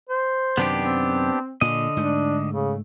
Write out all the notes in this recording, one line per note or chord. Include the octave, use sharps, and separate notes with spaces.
C5
F#2 C3 D#3 B3 D4 G4
C4
A#2 D3 D#5
G#2 A3 D4
C#3